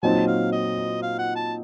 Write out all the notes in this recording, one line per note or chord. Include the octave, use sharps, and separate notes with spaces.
A#2 F#3 C4 D#4 A5
F5
D#5
F5
F#5
A5